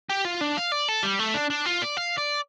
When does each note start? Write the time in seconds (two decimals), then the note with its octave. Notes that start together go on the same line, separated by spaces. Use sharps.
0.09 G4
0.25 F4
0.41 D4
0.57 F5
0.72 D5
0.88 A4
1.03 G3
1.19 A3
1.34 D4
1.50 D4
1.66 F4
1.82 D5
1.97 F5
2.17 D5